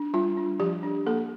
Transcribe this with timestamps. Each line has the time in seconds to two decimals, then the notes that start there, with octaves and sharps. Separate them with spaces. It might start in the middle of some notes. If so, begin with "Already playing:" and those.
Already playing: D4
0.14 G3 F4
0.37 D4
0.60 F3 G4
0.83 D4
1.06 A#3 A4